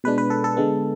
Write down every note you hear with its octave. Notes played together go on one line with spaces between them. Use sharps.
B2 G#3 D4 B4
B4
A4
A4
D3 G#3 B3